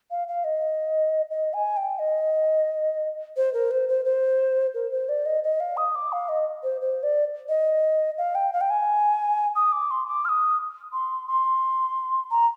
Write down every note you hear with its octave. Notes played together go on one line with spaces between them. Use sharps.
F5
F5
D#5
D#5
G#5
G5
D#5
C5
A#4
C5
C5
C5
A#4
C5
D5
D#5
D#5
F5
D#6
D6
F5
D#5
C5
C5
D5
D#5
F5
G5
F5
G5
G#5
D#6
D6
C6
D6
F6
D#6
C6
C6
A#5